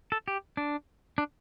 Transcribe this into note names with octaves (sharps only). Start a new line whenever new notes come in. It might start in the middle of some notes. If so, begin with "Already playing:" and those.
A4
G4
D4
D4